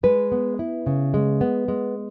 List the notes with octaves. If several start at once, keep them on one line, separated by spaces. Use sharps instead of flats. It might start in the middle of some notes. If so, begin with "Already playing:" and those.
G#3 B4
B3
E4
C#3
G#3
B3
G#3